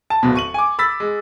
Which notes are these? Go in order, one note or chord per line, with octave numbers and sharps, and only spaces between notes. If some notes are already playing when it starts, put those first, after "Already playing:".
A5
D1 B2
C#6 D#7 F#7
G#5 D6
B5 E6 A6 B6
G#3